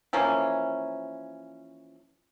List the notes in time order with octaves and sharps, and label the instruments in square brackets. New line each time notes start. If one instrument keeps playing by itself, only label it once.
[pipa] E3 F3 A#3 C#4